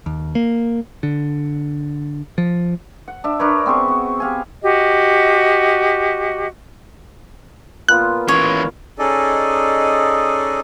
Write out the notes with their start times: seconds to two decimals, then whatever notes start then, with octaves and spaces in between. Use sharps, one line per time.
0.06 D#2
0.35 A#3
1.03 D3
2.38 F3
3.08 F#5
3.24 D4 E5
3.39 D4 A#4 B4 C#5
3.66 B3 C4 G#4 C#6
3.88 F#4
4.20 G4 F5 G#5
4.62 F#4 G4 D#5
7.88 A#2 B3 F4 F#6
8.28 E3 C#4 C#5 D6
8.99 C#4 D#4 G#4 A4 D5 D#5